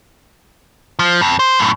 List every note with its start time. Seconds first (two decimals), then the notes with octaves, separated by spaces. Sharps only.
0.99 F3
1.21 F2
1.39 C5
1.59 F#2 A2